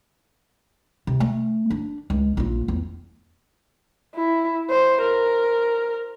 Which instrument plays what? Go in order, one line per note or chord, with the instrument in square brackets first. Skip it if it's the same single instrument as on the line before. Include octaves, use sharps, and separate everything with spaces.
[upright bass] C3
A3
D4
C#2
A#1 F4
E2
[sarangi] E4
C5
A#4